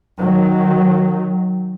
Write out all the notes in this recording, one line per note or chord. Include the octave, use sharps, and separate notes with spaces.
D#3 F#3